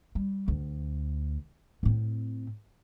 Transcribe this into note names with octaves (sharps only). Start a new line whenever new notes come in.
G3
D2
A2 C4